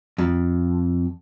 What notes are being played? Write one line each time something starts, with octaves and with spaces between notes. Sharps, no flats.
F2